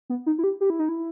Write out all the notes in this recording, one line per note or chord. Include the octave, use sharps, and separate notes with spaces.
B3
D#4
E4
G4
G4
E4
D#4
E4